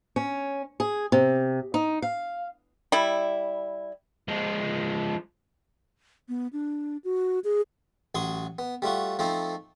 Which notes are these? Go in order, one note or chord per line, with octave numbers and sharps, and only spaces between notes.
C#4
G#4
C3
D#4
F5
G3 E4
F3 G#3
B3
D4
F#4
G#4
A1 F#3 C6 C#6 D#6
B3
G3 A3 F4 F#4
F3 A3 C4 D#4